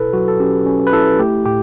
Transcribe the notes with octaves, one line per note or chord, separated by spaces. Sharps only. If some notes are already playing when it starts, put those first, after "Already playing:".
Already playing: B2 E4 A4 B4
F#3 F#4
A4
C#4 G4
C#4
B4
E4 A4
A3 G4
A2 G4